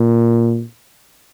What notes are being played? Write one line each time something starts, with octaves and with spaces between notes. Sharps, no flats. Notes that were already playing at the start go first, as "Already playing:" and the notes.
Already playing: A#2